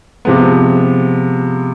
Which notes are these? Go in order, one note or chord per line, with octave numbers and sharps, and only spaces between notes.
C3 F3 G#3 B3